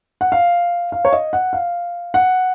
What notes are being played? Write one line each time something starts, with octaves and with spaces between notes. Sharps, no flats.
F#5
F5
F5
C#5
D#5
F#5
F5
F#5